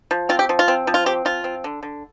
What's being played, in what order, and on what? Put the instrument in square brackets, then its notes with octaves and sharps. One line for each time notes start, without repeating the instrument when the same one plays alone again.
[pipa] F3
C4 F4
G4
F3
F4
C4
F3
F4
C4 G4
F3 F4
C4
D3
D3